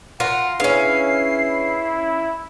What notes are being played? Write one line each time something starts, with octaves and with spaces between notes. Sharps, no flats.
F4 A#4 F#5
C#4 D4 E4 G#4 B4 F5 C7